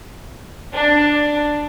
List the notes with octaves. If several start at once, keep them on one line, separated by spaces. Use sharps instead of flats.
D4